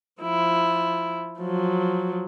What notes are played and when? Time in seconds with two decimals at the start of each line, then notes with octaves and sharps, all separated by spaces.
0.21 F3 E4
1.39 F3 F#3